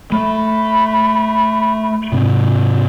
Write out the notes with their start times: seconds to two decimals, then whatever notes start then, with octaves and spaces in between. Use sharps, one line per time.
0.12 A3 B5
2.12 G#2 C3 C4